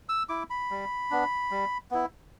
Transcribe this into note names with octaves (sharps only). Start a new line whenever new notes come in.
E6
E4 D6
B5
G3
B3 D4
G3
B3 E4